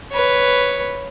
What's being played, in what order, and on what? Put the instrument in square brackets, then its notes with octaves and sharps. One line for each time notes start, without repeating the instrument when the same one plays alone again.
[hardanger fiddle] B4 C#5